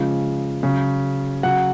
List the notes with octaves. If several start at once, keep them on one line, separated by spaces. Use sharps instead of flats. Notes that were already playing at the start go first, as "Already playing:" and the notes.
Already playing: C#3 F3 G#3
C#3 F#3
C#3 F#3 F#5